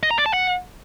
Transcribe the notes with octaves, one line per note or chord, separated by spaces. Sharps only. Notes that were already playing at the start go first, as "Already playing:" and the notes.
D#5
A#5
D5
A5
F#5